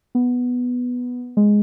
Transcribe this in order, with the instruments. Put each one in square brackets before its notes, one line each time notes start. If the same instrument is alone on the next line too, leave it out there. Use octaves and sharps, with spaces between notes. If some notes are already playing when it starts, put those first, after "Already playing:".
[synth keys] B3
G#3